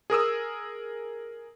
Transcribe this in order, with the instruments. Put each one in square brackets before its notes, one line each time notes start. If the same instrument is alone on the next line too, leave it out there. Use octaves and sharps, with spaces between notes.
[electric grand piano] G#4 A#4 D#6 E6